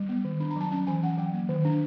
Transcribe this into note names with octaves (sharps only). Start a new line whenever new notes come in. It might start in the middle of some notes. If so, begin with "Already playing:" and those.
Already playing: G3
B3
D#3
D4 B5
A#5
F#3 A5
C#4 A5
E3 G#5
C#4 F#5
F#3 G5
A#3
D#3
D4